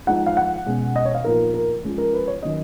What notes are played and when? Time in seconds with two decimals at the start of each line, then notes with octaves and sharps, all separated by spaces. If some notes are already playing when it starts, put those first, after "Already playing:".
0.07 F3 G#3 D#4 F#5
0.26 F5
0.37 F#5
0.66 B2 G#3 C#4
0.96 D#5
1.05 C#5
1.15 F5
1.25 A#2 F3 B3 D#4 A#4
1.54 A#4
1.84 F3 G#3 C#4
1.98 A#4
2.13 B4
2.27 C#5
2.43 D#3 F#3 C#4 D#5